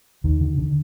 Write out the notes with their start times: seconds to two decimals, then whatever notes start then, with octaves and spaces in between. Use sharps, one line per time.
0.24 D#2 D#3
0.41 D3
0.58 D3